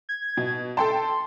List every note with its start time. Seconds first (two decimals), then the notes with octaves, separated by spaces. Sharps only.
0.09 G#6
0.37 B2
0.77 A4 G5 A5 C6